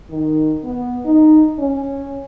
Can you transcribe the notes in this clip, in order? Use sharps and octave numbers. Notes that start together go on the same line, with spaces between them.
D#3
B3
D#4
C#4